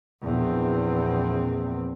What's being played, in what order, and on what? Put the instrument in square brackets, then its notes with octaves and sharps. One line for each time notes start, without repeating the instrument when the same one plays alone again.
[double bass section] A#1 E2 C4